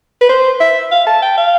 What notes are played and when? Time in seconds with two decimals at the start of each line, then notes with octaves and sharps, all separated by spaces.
0.21 B4
0.29 C5
0.60 E5
0.91 F5
1.07 A5
1.22 G5
1.38 F5